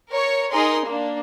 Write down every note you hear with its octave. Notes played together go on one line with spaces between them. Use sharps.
A#4 C#5
D#4 G#4 A#4 C6
A#3 D4